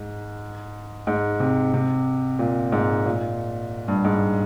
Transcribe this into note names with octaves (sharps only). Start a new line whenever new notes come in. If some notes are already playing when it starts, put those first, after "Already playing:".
Already playing: G#2
G#2
C3
C3
A#2
G#2
A#2
G2
G#2